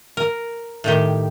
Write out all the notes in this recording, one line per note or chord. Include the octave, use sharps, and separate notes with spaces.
A#4
A2 D#3 G4